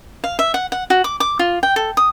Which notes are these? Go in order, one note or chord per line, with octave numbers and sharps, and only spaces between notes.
F5
E5
F#5
F#5
F#4
D6
D6
F4
G5
A4
D#6